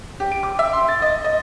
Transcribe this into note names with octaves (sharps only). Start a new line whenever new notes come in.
G4
D7
D6
E5
C6
A6
D#5
D#5